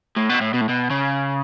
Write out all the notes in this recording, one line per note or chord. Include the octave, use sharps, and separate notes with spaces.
A2
B2
A2
B2
A2
B2
C#3